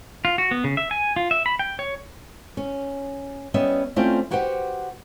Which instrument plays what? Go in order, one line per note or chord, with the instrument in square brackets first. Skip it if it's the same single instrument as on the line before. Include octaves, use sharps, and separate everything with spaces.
[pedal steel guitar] F4
F#4
B3
C#3
E5
G#5
F4
E5
B5
G5
C#5
[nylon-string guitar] C#4
G3 B3 C#4 D#5 E5
A3 C4 C#4 F4 C5 D5
E4 F#4 G4 B4 C5 F#5